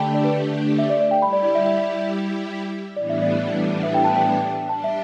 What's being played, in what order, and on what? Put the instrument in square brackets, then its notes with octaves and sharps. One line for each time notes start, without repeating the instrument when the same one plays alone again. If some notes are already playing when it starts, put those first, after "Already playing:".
Already playing: [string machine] D3 A3 D4 G4 [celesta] G5 A5 B5
[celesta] D5
B4
E5
D5
D5
G5
[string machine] G3 E4 G4 [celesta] B5
[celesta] D5
D5
E5
E5
[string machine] A2 E3 G3 B3 D4 [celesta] D5
[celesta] E5
D5
E5
G5
A5
G5
[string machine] G3 D4 G4 [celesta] A5
[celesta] E5